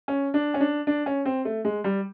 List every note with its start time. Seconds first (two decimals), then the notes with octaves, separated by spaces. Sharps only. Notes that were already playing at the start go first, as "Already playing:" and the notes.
0.08 C#4
0.34 D4
0.54 C#4
0.60 D4
0.87 D4
1.06 C#4
1.25 C4
1.45 A3
1.65 G#3
1.84 G3